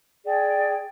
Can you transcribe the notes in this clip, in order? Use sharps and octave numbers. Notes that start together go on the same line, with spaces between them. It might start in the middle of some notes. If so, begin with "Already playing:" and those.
G#4 D5 G5